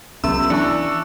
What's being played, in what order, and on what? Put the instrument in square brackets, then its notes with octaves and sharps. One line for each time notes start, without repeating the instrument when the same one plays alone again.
[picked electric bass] C2 F#3 [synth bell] B3 C#4 E5 [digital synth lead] E6
[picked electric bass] E3 [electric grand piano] D4 [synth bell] C#6 F#6 C#7